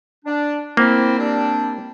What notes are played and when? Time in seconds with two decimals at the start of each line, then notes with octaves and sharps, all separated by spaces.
0.25 D4
0.77 A#3 C4 E4
1.18 G3 C4 D4